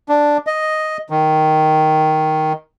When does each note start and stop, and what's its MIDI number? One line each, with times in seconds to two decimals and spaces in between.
0.09 0.37 62
0.47 0.97 75
1.10 2.53 51